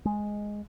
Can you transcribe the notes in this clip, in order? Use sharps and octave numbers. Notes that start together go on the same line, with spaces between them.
G#3